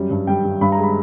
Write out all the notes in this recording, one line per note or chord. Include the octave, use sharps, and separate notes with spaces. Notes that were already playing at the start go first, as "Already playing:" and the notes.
Already playing: F#2 G3
G2
G3 G5
G3
G2 B5
A#5
G#3
B5